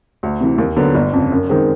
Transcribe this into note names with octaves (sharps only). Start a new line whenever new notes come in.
D2
C3 E3
D#2
D3 F#3 B3
G1
F2 C#3
F#2
D#3 G#3 C4